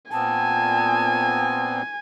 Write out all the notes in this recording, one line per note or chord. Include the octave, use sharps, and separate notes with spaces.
A#2 B3 C4 G#5 A5